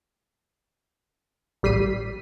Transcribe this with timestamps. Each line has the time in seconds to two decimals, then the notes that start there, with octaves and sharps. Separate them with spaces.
1.63 A1 G3 B6 C7 D#7